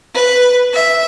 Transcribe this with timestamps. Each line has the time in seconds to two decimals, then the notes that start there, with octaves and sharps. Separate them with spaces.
0.14 B4
0.74 E5